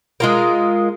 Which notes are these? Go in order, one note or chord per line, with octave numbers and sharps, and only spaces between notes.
G#3 F4 A#4